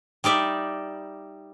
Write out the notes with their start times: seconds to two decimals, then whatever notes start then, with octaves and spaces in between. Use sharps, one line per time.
0.24 G3 D#4 D5 E5